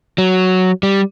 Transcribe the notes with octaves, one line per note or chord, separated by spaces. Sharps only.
F#3
G3